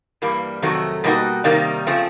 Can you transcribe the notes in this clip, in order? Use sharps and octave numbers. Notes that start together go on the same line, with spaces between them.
G2 E3 G3 A#3
F2 C3 D#3 F#3 A3
B2 G3 A#3 D#4 F#4
C3 D#3 G3 A#3 D#4
C#3 F3 A3 C4